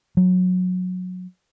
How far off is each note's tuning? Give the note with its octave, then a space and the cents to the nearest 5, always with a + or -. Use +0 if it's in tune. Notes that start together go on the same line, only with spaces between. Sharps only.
F#3 -20